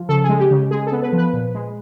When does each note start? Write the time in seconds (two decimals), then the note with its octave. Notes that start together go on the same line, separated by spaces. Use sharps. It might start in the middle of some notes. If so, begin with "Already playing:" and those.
Already playing: F3
0.09 C#3 A4
0.24 G#4
0.29 G#3
0.40 G4
0.51 C#3
0.71 G#3 G#4
0.87 A4
0.92 B3
1.02 B4
1.12 F3
1.18 B4
1.33 A#2
1.55 G#3